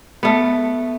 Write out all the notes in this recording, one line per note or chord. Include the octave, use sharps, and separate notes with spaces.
A3 B3